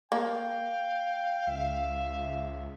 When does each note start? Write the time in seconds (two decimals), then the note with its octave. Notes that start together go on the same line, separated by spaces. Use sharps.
0.12 A#3 F5 G5
1.47 C#2 E5